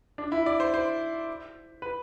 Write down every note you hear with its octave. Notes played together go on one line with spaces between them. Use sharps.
D4
E4
D5
C5
C5
B4